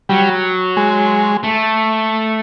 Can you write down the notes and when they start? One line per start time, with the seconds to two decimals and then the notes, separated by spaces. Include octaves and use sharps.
0.09 F#3 G3
0.77 G#3
1.43 A3